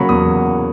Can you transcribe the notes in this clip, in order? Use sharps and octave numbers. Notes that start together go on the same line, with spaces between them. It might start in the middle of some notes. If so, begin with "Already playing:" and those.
Already playing: C#3 F#3 A#3 B5 C#6
E2 D#6